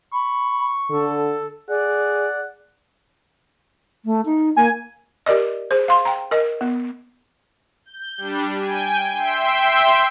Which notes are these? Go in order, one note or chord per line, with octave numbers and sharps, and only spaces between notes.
B5 C#6
D3 A4
G#4 D5 F#5
A3
D#4
A#3 G#5
G4 A#4 D5 D#5
G#4 C5
F5 C6
G5 A#5
A#4 D#5
B3
G6
G3 D4
G5 G#5
E5 G5 C6